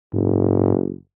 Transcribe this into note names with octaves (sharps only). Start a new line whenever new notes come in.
F#1 G#2